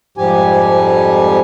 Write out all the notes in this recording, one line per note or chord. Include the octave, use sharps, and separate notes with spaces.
F2 G#2 F3 G3 G4 G#5